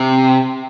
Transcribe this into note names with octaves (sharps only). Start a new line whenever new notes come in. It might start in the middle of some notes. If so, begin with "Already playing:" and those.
Already playing: C3